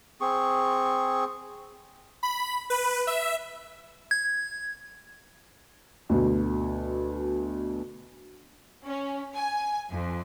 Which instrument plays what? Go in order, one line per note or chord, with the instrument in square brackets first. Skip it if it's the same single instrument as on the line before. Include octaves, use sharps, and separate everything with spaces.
[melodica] C4 G#4 C#6
[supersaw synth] B5
B4
E5
[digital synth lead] G#6
[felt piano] D2 B2
[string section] C#4
G#5
F2